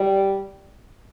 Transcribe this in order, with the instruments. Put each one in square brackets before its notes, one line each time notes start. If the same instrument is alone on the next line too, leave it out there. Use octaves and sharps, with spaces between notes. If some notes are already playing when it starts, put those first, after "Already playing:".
Already playing: [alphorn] G3